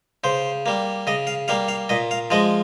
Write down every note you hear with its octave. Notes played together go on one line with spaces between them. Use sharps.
C#3 C5
G3 A#3
C#3 D#5
F5
G3 A#3 F5
F5
A#2 D#5
F5
F3 G#3 D#5